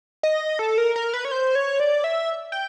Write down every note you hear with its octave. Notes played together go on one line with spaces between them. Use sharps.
D#5
A4
A#4
A#4
B4
C#5
C5
C#5
D5
E5
G5